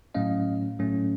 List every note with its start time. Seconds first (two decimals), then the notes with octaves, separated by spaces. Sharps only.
0.15 A2 F#3 A3 C#4 D#5 F5
0.79 A2 F#3 A3 C#4